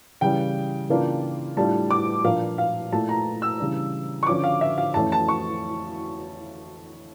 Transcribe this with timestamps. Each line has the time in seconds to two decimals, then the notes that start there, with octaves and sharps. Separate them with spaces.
0.21 C#3 E3 G3 G5
0.89 C#3 E3 A#3 D4 F4
1.57 A2 G3 D4 F4 A5
1.91 D6
2.24 A#2 F3 A#3 D4 F5
2.58 F5
2.92 A#2 A3 E4 A5
3.09 A#5
3.42 E6
3.59 C#3 E3 G3 D4
4.23 C#6
4.27 D3 F3 C#4 F4 D6
4.44 F5
4.61 E5
4.78 F5
4.94 F2 E3 A3 C#4 A5
5.12 A5
5.28 C#6